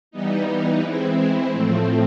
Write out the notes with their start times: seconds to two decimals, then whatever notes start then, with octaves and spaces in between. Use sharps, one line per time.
0.11 E3 G3 B3 D#4
0.82 E3 G#3 C4 E4
1.52 A2 F3 A3 C4